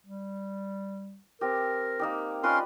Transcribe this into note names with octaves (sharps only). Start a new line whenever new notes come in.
G3
C4 G4 A#4
A#3 D#4 G4
C#4 F4 A#4 B4 D5 D#5 C6